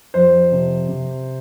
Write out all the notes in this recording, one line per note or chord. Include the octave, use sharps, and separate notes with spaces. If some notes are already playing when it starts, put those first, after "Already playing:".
F2 C5
C3
C3